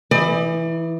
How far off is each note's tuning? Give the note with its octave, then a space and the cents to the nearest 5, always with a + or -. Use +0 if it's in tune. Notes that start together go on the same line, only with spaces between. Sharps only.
E3 +0 D#4 +40 D5 +40